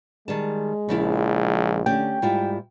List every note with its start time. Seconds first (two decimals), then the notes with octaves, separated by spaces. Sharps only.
0.28 D#3 G3 G#3 A5
0.89 A#1 C#3 F3 E4
1.86 D3 A3 C#4 G4 G5
2.22 G#2 G3 E4 F4